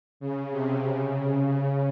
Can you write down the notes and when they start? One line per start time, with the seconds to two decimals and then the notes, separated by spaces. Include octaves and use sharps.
0.20 C#3
0.51 C3
0.83 C#3